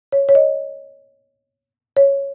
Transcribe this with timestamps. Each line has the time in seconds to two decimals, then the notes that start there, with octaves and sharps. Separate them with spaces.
0.13 C#5
0.29 C#5
0.35 D#5
1.97 C#5